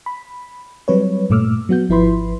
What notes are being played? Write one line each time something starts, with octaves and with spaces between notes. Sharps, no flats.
B5
F#3 G3 C4 B4 C#5
G2 A#2 A3 D6 E6 F6
F#3 B3 F#4 G6
G#1 F3 E4 B4 B5 C6